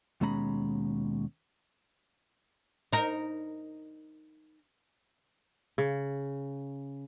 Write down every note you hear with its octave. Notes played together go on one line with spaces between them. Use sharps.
D#2 B2 G#3 C#4 A#5 B5
D#4 A#4
C#3